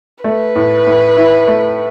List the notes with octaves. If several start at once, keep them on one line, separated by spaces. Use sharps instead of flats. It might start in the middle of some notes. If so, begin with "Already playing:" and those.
A3 B4
A2
A2
E4
A3